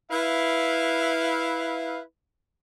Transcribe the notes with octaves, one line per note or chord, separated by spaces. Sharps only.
E4 B4 F5